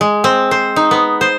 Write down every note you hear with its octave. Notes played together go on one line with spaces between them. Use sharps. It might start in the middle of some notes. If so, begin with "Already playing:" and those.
G#3
C4
C5
D#4
B3
C5